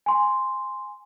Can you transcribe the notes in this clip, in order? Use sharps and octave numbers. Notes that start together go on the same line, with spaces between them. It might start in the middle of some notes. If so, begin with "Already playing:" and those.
G#5 C6